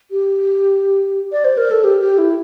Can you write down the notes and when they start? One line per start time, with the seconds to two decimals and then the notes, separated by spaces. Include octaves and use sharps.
0.11 G4
1.32 D5
1.45 C5
1.57 A#4
1.71 A4
1.84 G4
2.01 G4
2.18 E4